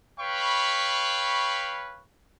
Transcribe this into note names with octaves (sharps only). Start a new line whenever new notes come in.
B4 C#5 F5 G5 B5 C#6